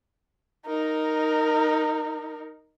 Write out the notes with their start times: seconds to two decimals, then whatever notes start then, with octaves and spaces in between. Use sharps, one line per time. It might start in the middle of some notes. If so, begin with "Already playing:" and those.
0.66 D#4 A#4